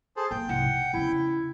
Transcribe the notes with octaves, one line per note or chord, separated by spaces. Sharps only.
G#4 A4 C5
A#3 G5
C2 G#2 F#5
B2
E2 C#3 E4